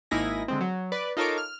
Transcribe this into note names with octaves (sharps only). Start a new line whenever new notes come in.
G#1 A#3 D#4 E4 G#5 A#6
D3 G#3 C4
F#3
B4 D5
D#4 F4 A4 A#4 C#5 D6
F6